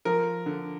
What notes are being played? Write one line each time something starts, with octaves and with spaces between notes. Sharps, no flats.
F3 A#4
D3